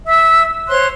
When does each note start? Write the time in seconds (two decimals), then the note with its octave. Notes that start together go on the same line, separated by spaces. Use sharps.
0.06 E5 E6
0.68 C5 C#5 C6 F#6